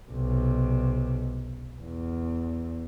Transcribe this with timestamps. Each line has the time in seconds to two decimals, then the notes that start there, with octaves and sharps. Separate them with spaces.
0.11 B1 C3
1.81 E2